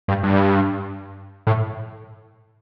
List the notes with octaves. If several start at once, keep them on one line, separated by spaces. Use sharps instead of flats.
G2
G2
A2